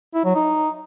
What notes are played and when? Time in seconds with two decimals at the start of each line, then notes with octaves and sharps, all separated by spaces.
0.15 E4
0.25 F#3
0.35 D#4